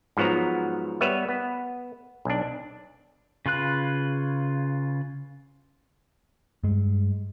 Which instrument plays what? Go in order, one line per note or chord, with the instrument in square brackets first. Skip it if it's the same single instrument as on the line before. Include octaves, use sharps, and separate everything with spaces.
[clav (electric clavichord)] G#2 F3 F#3 B3 F#4 A#5
G3 B3 B4 C#5 E5
B3
B1 D4
[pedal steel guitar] C#3 F4 B4 F#6
[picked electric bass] G2 G#3